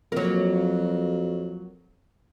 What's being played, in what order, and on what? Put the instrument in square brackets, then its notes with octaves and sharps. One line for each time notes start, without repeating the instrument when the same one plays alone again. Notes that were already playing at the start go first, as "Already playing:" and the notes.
[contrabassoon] F2 [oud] F#3 A#3